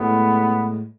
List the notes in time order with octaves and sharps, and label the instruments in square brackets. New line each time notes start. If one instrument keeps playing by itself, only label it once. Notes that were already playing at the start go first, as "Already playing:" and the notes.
Already playing: [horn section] A2 G#3 B3